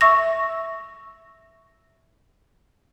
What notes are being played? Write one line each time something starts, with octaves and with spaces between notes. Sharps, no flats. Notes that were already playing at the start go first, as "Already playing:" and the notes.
E5 C#6 E6 A#6